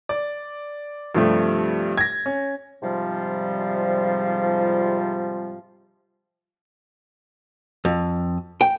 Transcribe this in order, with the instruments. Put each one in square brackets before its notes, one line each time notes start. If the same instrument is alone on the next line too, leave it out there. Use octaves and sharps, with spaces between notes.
[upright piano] D5
G2 C3 F3 G3 A3
G#6 A#6
C#4
[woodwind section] G#2 C3 F3 G3
[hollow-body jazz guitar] F2
G5